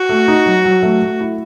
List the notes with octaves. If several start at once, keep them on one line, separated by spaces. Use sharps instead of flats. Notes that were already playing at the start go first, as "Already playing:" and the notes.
Already playing: F#4
A3
D#4
F#3
F#3
A3
A3
E4